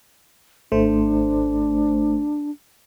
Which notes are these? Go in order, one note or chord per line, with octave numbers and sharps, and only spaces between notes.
G#1 A3 D4 C5